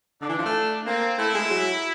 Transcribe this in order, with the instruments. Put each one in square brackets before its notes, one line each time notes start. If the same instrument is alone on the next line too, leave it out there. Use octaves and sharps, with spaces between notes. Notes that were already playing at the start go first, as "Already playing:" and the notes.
[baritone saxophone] D3 [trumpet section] D4
[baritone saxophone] E3
F3
A3
[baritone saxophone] A#3 [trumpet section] C4
[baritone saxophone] A3 [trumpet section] E4
[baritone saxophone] G#3
F#3